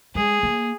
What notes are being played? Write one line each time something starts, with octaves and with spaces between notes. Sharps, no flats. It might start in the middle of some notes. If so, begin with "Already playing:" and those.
G#3 G#4
A#3